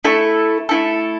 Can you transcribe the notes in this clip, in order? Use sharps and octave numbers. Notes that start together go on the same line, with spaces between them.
A3 E4 A4
A3 E4 A4